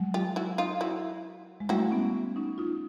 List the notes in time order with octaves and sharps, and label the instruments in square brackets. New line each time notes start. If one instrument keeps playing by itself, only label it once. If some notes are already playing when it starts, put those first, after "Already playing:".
Already playing: [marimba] F#3 G#3
[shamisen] F4 G4
E4 F#4
D#4 F4
E4 F#4
[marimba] G#3
[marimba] G3 A3 [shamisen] E4 F#4
[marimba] B3 C#4
C#4 D#4
D#4 F4